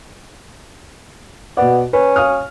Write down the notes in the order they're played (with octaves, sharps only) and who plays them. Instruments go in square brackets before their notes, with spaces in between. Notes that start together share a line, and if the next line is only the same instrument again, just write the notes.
[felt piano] B2 D5 [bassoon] B3
[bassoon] C#4 [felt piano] B4
[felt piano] F5 D#6 F6